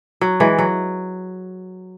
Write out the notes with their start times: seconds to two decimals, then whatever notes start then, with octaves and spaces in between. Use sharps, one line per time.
0.21 F#3
0.40 E3 G#3
0.59 F#3